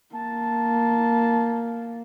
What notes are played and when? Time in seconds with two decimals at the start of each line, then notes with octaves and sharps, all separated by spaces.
0.16 A#3 A5